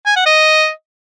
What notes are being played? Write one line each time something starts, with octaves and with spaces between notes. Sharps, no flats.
G#5
F#5
D#5